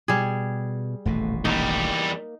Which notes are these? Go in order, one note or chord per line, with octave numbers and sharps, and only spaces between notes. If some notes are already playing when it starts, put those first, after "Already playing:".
B2 G3 G#4
D#1 A1 B2 A3
E2 G3 A#3 D#4